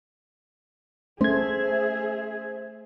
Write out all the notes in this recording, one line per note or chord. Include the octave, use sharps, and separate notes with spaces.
A3 C#4 G#4 C5 E5 G#6